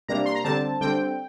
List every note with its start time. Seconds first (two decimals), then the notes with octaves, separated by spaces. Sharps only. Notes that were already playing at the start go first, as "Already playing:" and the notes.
0.08 C3 G3 A#3 D4 A#5
0.26 C6
0.35 A#5
0.45 D3 G3 C4 A5
0.81 D3 G3 C4 G5